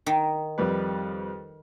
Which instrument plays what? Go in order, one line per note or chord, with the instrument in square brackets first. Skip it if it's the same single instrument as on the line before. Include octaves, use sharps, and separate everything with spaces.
[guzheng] D#3
[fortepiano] F2 G3 B4